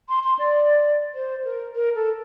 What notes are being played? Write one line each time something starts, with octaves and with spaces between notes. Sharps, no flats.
C6
C6
D5
C5
A#4
A#4
A4